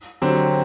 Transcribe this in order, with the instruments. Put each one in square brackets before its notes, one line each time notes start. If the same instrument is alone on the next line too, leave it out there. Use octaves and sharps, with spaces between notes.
[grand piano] D3 F#3 C4 G4